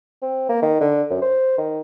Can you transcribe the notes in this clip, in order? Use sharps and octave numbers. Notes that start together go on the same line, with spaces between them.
C4
A#3
D#3
D3
F#2
C5
D#3